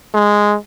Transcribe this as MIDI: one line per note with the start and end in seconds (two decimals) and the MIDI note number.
0.14 0.56 56